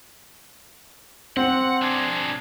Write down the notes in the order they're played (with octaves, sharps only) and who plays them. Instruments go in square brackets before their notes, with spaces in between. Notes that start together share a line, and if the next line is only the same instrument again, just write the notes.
[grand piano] C4 [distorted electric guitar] F#5
[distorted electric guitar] D4 G#4